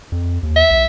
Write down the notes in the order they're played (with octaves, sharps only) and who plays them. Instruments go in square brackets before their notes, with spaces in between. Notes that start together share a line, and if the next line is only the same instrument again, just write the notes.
[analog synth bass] F2
D#2
[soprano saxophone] E5
[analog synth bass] B1